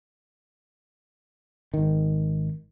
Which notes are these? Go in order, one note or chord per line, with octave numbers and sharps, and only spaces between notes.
G#1 D#3